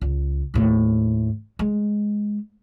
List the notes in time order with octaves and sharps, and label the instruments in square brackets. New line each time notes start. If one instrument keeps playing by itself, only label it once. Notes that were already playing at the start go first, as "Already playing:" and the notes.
[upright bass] C#2
D#2 A2
G#3